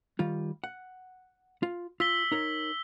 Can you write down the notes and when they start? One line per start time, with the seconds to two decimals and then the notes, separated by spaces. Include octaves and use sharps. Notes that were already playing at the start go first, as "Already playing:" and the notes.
0.19 D#3 G3 F4
0.64 F#5
1.63 F4
2.00 F4 E6 B6 G7
2.32 D#4 A#4 C#5